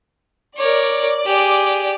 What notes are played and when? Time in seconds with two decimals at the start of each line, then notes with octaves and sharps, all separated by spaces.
0.57 A#4 C#5 D5
1.26 G4 G#4